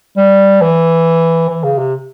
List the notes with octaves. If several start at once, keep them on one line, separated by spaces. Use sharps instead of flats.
G3
E3
E3
C#3
C3